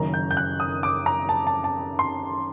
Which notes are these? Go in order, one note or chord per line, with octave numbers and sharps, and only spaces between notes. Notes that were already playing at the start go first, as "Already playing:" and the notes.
Already playing: F#1 F#2 D#3 A#5
G6
G6
F#6
D#6
D6
A#5
A5
A5
A5
C6